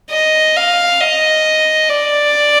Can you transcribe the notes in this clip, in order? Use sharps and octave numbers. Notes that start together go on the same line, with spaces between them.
D#5
F5
D#5
D5